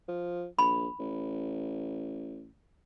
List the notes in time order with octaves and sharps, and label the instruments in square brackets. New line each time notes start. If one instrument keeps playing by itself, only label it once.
[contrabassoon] F3
[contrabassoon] A#1 [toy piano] B5
[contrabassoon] A1